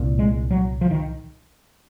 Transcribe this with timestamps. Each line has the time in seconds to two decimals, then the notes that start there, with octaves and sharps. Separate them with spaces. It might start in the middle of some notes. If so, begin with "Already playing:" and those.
Already playing: C2 A#2
0.19 G#3
0.51 F#3
0.81 F3
0.91 D#3